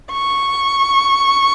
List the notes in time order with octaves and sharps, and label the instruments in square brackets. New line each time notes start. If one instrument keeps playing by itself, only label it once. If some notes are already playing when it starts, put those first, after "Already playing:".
[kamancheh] C#6